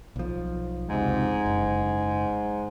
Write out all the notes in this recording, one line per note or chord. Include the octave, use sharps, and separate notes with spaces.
B1 F3
F1 C#2 G#2 C3
F#1